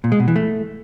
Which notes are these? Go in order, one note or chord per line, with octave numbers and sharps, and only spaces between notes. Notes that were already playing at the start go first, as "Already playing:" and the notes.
A#2
G#3
B2
E3
A3